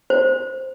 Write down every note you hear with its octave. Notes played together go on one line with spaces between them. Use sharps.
C5